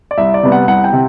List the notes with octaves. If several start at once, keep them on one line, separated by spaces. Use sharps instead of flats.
D5
C2 E5
D5
C3 G3 B3
F#5
C2 F#5
G5
C3